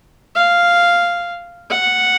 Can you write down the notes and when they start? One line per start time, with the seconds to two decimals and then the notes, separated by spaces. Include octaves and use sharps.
0.35 F5
1.71 F#5